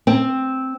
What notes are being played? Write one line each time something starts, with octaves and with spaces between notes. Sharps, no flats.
C4